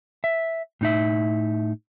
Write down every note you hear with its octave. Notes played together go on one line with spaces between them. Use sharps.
E5
A2 D#4 E5